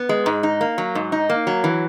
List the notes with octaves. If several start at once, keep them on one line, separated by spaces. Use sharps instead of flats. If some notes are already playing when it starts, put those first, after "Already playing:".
Already playing: B3
G#3
G#2
D#4
A#3
F#3
G#2
D#4
A#3
F#3
E3